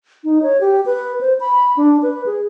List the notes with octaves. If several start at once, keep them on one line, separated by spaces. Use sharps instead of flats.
D#4
C#5
G4
B4
C5
B5
D4
B4
G#4